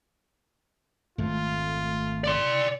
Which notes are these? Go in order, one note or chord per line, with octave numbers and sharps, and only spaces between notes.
G#1 F2 A3 F4
D5 C6